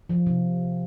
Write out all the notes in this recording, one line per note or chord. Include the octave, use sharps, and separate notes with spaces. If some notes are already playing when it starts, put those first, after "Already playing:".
F3
C3